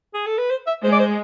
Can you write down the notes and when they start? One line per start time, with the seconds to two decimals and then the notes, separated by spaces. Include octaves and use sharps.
0.14 G#4
0.26 A4
0.38 B4
0.50 C5
0.67 E5
0.83 G#3 C5
0.92 D5
0.99 C5